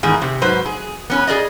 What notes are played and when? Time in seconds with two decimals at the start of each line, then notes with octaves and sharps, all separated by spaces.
0.03 E2 G#2 D#3 G#4
0.22 C3
0.42 G#2 F#3 B4 C5
0.65 G#4
1.10 B3 C#4 B4
1.27 G#4 A#4 D5 D#5